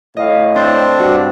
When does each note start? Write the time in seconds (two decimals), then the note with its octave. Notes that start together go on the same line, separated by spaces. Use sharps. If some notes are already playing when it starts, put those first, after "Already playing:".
0.17 A2 D#5 F5
0.56 C4 D4 C5 A5
0.99 G2 F#4